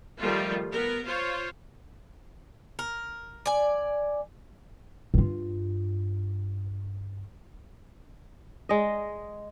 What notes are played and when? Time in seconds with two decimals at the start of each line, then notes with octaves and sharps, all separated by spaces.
0.20 D#3 F3 G3 A3 F4
0.70 B3 A#4
1.05 F4 C5 C#5
2.79 A#4
3.46 D5 G#5
5.14 G2 F4
8.69 G#3 D#5